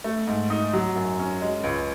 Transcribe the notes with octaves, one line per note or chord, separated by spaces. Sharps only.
A3
G#2
D#4
F#3
F#2
C#4
G#3
C#2